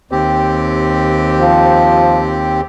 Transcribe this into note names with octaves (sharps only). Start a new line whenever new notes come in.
D#2 C4 G4
F3